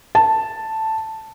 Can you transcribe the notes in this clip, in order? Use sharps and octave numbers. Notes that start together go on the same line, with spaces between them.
A5